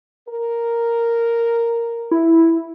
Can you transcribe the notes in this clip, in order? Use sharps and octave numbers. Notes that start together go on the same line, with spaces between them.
A#4
E4